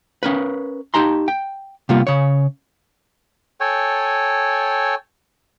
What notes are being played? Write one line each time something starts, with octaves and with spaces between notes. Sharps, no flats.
C#4 A#4 B4
D#4 G4 A5 A#5 C6
G5
C3 G3 A#3 B3 F4
C#3 C#5
A4 C#5 G5 G#5